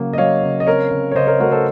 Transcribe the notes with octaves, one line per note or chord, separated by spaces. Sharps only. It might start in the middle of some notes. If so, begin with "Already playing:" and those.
Already playing: C#3 F#3 A#3
D#5
F#3 C#5 F5
C#3
D#5
C4 A#4 C#5
C#3
C#5
C#3 C5 D#5
A#4 C#5
A3 F#4 A#4
A4 C5